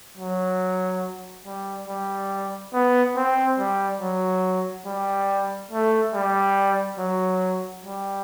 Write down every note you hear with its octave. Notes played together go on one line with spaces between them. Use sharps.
F#3
G3
G3
B3
C4
G3
F#3
G3
A3
G3
F#3
G3